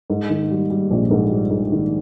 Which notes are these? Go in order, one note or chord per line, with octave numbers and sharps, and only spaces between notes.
G#2
D#3
G3
G3
A#1
G#2
G3
G#2
D#3